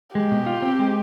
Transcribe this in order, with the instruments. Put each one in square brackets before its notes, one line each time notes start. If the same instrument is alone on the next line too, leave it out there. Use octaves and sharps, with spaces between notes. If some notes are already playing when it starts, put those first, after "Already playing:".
[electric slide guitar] G#3 [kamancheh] G4
[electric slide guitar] B2
F4
C4
G#3